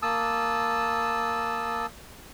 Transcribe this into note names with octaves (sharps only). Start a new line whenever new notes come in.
A#3 A5 D#6 E6